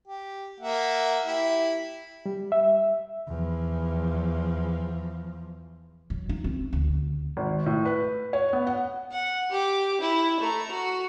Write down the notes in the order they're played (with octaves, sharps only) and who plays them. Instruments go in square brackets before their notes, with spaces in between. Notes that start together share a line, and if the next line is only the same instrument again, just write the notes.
[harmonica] G4
A#3 E5 F#5
E4 G4 E5
[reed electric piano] G3
E5
[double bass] E2 F3
[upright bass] F#3
D#4
C4
D2
[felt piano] G#1
A2
B4
C#5
B3
F#5
[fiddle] F#5
G4 D6
E4
A3 A#5
F#4